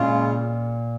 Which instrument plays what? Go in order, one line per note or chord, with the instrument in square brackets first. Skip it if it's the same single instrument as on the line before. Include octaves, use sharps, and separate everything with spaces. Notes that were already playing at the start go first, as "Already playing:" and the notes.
Already playing: [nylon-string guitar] A#2 [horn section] C#3 G#3 F4